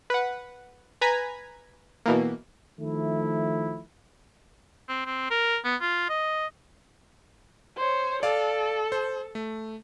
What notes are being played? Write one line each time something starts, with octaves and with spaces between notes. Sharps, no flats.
B4 F#5
B4 G#5 A#5 G#6 B6
B2 E3 A#3
D#3 F3 A3 E4
C4
C4
A#4
B3
F4
D#5
C5 C#5
A4 D5 F5
C5
A3